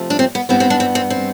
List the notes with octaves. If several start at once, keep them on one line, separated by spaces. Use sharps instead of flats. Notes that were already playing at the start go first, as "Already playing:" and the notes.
Already playing: C3 F3 A3
D4
C4
B3
G2 E3 G3 B3 C4
C4
D4
C4
C4
C4